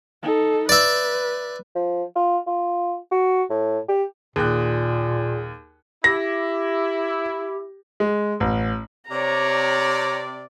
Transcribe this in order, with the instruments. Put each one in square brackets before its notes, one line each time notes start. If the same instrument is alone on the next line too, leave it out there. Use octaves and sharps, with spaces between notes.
[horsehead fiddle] D#4 A4
[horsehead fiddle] B4 [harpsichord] D5 E5
[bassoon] F3
F4
F4
F#4
A2
G4
[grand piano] D#2 G5 F#6 [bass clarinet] A#2 [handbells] G#4
[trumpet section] E4 [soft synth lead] G4 [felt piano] A#6
[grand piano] G#3
A1
[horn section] C3 D5 [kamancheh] C#5 A#5